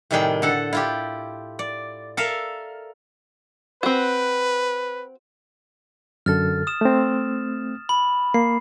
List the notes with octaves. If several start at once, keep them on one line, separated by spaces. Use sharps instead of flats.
A2 C3 D#3 G3 G#4 G5
D3 A4 F#5
E4 F4 G4
D5
A4 A#4 E5 F5
C4 F#4 B4
F#2 D3 A4 F6 A6
D#6 E7
A3 C4
B5
A#3 C7